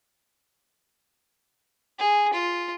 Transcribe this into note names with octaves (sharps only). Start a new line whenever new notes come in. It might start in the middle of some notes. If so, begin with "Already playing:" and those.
G#4
F4